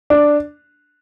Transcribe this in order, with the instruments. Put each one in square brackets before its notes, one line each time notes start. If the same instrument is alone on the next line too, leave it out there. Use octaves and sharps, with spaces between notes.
[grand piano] D4